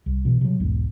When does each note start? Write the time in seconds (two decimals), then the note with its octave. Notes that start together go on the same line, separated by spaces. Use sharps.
0.06 C2
0.25 B2 E3
0.41 C3 D#3 F#3
0.60 B1 E2 G#2